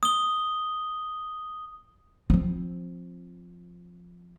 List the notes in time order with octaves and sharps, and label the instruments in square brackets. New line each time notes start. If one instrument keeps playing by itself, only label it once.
[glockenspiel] D#6 G7
[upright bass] F3 C4